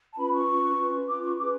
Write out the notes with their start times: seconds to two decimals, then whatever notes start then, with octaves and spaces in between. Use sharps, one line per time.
0.12 A5
0.17 C#4 F4 B4 B5
0.32 C#6
0.47 C#4 F4 B4
0.77 C#4 F4 B4
1.07 C#4 F4 B4 D6
1.23 C#6
1.37 C#4 G#4 B4 D6